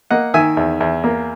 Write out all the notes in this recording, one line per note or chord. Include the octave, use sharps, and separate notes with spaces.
A#3 D#5 F#5
D#3 E5 G#5
E2
E2
A#3